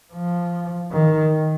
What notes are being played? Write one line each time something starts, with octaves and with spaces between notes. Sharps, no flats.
F3
D#3